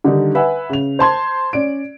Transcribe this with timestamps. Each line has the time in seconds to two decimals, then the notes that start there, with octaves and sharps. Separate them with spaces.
0.04 D3 D#3 G3 D#4
0.35 B4 E5 F#5 G#5
0.70 C#3 F7
0.99 C5 A5 C6 G#6
1.53 C#4 D5 D7